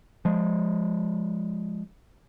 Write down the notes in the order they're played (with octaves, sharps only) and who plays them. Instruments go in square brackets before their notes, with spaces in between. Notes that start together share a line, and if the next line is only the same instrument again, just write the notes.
[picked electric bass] F3 G#3